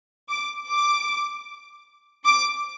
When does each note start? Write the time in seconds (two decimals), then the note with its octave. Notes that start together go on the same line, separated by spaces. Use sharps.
0.29 D6
0.68 D6
2.25 D6